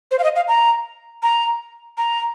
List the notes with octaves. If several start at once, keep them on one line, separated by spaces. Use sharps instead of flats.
C5
F5
D#5
F5
A#5
A#5
A#5